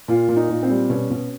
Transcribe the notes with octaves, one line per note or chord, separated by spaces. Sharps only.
A#2 F4
A#2
D#4
A#2
C4
G3
B2 C#4
B2